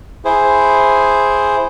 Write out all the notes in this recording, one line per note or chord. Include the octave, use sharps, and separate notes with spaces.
E4 G#4 C5